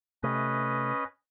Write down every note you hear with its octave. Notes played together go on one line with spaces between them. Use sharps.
C3 A3 C#4 B4 D#5